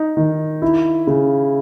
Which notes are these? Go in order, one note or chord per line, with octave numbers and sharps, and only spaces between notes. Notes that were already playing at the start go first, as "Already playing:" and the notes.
Already playing: D#4
D#3
E4
C#3